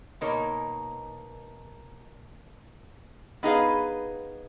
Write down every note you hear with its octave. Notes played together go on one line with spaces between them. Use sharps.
B2 A#3 D#4 A#4 C#5
B3 D#4 G#4 B4 F5